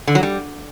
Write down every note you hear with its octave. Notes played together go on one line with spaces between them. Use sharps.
D3
F#3
G3